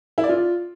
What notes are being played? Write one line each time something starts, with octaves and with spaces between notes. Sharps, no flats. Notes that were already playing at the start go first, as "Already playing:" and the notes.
E4
D5
F4